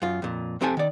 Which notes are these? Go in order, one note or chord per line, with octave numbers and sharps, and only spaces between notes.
F#2 F4
F2 A#2
F2 C4 G4 A4 G#5 A5
D#3 D5